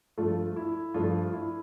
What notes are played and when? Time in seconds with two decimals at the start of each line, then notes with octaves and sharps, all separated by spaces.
0.18 G2 F3 A3 F4
0.56 E4
0.94 G2 F3 A3 F4
1.33 E4